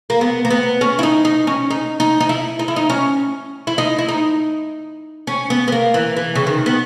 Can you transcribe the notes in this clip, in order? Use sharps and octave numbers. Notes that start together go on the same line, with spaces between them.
A#3
B3
A#3
B3
C#4
E4
D#4
D#4
C#4
D#4
D#4
D#4
E4
D#4
E4
D#4
C#4
E4
D#4
E4
D#4
C#4
B3
B3
A#3
E3
E3
C#3
D#3
B3